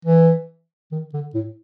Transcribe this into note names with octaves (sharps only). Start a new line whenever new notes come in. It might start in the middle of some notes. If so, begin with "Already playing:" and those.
E3
D#3
D3
A2